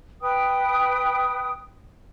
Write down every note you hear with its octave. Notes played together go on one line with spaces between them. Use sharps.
B4 G5 D#6